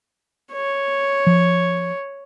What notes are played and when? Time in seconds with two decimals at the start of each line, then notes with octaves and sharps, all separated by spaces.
0.53 C#5
1.27 F3